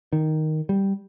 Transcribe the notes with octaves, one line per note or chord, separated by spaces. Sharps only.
D#3
G3